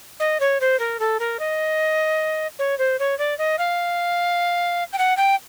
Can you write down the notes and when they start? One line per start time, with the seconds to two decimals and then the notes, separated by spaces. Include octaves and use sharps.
0.20 D#5
0.40 C#5
0.61 C5
0.79 A#4
1.00 A4
1.20 A#4
1.40 D#5
2.59 C#5
2.79 C5
2.99 C#5
3.19 D5
3.38 D#5
3.59 F5
4.93 G5
4.98 F#5
5.17 G5